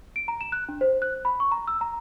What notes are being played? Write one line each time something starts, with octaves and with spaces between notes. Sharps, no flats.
D7
A#5
E7
F#6
D4
C5
F#6
B5
C#6
A#5
E6
A#5